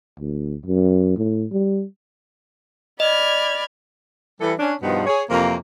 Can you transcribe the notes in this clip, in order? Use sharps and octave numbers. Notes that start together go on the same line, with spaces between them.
D2
F#2
A2
G3
D5 D#5 B5 F6 G#6
E3 G3 A4
C#4 D4
G2 B2 D#3 F3 B3 D#4
G#4 C#5
F2 C3 E3 A#3